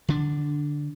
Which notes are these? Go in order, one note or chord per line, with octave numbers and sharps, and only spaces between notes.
D3 D4